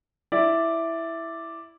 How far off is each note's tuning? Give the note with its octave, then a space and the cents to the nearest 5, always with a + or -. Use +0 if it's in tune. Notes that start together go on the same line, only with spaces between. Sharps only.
E4 +0 D5 +0